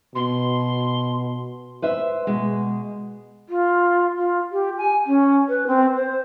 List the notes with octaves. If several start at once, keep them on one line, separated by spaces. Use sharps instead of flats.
B2 C6
B4 C5 E5
B2 G#3
F4
F4
G4
G#5
C#4
B4
C4
C5